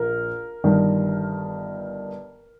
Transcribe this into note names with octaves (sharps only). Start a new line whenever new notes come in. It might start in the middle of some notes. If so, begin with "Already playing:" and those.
Already playing: A#1 A#4
G1 G2 D#3